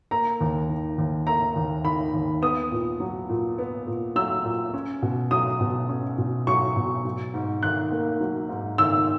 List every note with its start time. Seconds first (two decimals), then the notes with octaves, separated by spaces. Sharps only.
0.11 A#3 A#5
0.40 D#2
0.69 D#3
0.98 D#2
1.27 A#3 A#5
1.56 D#2
1.84 D#3 B5
2.13 D#2
2.42 B3 D#6
2.72 A#2
3.00 F#3
3.29 A#2
3.58 B3
3.87 A#2
4.16 F#3 E6
4.45 A#2
4.74 C#4
5.02 B2
5.31 F#3 D#6
5.61 B2
5.89 C#4
6.18 B2
6.47 F#3 C#6
6.76 B2
7.05 F#3
7.34 G#2
7.63 D#3 F#6
7.92 A#3
8.21 F#3
8.49 G#2
8.78 D#3 E6